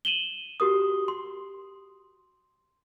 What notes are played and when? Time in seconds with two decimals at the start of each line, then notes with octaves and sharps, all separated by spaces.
0.05 D#7 E7 F#7 G7
0.60 F#4 G4 A#4 D#6
1.08 C6